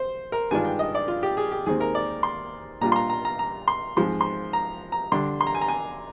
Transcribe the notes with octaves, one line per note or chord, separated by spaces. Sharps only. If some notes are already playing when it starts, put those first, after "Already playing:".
Already playing: C5
A#4
G2 D#3 G#3 D4 F4 G#5
G5
D#5
D5
F4
G4
G#4
G4
D#2 D#3 G#3 C4 G#4
A#4
D5
C6
A#2 G3 D4 F4 A#5
C6
A#5
A#5
A#5
A#5
C6
G#2 F3 G#3 C4 C6
C6
A#5
A#5
D3 G3 D4 C6
C6
A#5
G#5
A#5
G#5